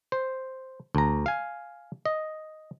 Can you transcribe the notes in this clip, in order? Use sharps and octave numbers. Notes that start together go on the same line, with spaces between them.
C5
D2 A#5
F5 G#5
D#5